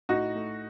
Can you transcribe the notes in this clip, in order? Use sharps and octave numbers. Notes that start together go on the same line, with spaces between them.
A2 D#4 F#4
A3